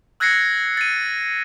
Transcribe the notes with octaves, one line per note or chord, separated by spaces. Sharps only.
E6 F#6 G#6 A#6 C7 C#7
A6 D#7